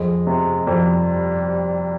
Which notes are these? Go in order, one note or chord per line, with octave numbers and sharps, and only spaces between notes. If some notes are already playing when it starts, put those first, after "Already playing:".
Already playing: F2 G#3
C3
F2 G3